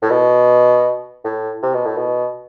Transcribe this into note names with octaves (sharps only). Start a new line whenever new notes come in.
A2
B2
A2
C3
B2
A2
B2